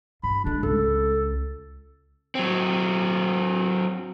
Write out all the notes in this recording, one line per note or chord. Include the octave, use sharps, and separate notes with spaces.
G2 B5
D3 G#3 D4
C#2 A4
F#3 C4